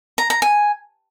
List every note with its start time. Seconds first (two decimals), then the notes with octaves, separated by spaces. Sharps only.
0.18 A#5
0.30 A#5
0.42 G#5